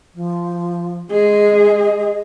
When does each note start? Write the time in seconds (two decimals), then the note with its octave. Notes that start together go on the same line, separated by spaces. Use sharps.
0.15 F3
1.11 G#3 G#4 D#5